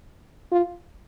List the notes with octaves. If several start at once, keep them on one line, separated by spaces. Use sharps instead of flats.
F4